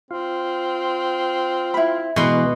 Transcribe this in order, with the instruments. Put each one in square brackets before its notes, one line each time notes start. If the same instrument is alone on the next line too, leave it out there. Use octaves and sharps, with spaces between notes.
[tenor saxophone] C4 [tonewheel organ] F4
[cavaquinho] E4 B5
[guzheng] B2 C6 [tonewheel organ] E3 G#3 B3 [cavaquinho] B4